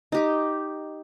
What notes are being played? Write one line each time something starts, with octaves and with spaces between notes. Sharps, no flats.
D#4 G4 D6